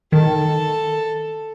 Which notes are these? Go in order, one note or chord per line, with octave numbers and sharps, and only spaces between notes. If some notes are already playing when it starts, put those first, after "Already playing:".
D#3 A4